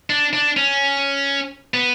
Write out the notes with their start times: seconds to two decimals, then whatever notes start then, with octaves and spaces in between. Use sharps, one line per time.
0.10 D4
0.33 D4
0.57 C#4
1.74 B3